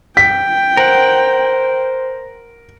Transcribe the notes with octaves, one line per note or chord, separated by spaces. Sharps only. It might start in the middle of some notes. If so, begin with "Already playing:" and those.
G5 B6
A#4 C5 F#5